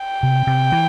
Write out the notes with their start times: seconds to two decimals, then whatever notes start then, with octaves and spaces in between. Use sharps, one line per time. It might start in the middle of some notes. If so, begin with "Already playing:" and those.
Already playing: G5
0.23 C3
0.47 C3
0.72 E3